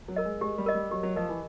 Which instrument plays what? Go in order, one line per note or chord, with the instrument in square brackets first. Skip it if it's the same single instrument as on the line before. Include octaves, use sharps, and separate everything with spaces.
[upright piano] F#3
[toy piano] A#4 D#5
[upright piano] G#3
[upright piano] G#3 [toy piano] G4
[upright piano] G3
[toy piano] A#4 D#5
[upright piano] G3
[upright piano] F#3 [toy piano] G4
[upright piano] F#3
[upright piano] F3 [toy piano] A#4 D#5
[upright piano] E3